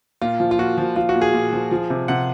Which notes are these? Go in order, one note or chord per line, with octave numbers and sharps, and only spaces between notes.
A#2 F4
F3
F4
A#2 F#4
F3
F3 F4
F#4
A#2
G#4
A#2
F3
F3
C3
C3 F#5